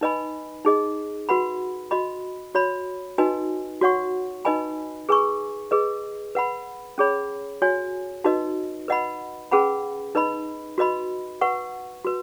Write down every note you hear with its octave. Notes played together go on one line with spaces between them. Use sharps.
D#4 B4 D#5 G#5 B5
D#4 G#4 D#5
F#4 B4 F#5 B5
F#4 D#5 B5
F#4 C#5 B5
D#4 F#4 B4 D#5 G#5
F#4 C#5 F#5 C#6
D#4 B4 D#5 G#5 B5
G#4 B4 G#5 C#6
G#4 B4 D#5
B4 F#5 B5
C#4 G#4 C#5 B5
F#4 C#5 G#5
D#4 F#4 B4 D#5
B4 D#5 F#5 B5
C#4 G#4 B4 F#5 B5
D#4 B4 D#5 B5
F#4 B4 D#5 B5
B4 F#5 C#6
F#4 B4